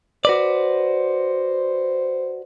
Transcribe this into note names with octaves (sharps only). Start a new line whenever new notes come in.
F#4 B4 C5 D5